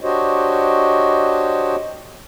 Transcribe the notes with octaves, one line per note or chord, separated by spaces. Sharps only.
D4 F#4 G4 C5 C#5 D#5